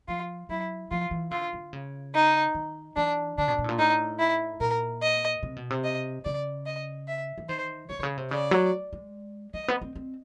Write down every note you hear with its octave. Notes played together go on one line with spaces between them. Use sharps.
F3 F4
F#3 E4
F3 F4
E3
D3 F4
D3
C#3
D#4
D#3
E3 D4
D3 D4
B2
B2
A2
A#2
A2 D#4
E4
A#2 A#4
D#5
C3
B2
C3
D#5
C#3 D5
D#5
E5
E3
D#3 C5
D3 C#5
C3
C#3
C3
C#3 D5
F#3
G#3
G#3 D#5
B3
C4
C4